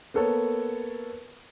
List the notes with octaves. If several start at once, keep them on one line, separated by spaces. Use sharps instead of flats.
A#3 B3 A4 C#5